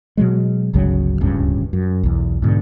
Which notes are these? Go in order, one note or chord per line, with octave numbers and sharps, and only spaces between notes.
B2 F#3 G#3
G1 C#2 C#3 F#3
D1 C#2 G2 C#3
F#2
B1 E2
G#2 B2 D3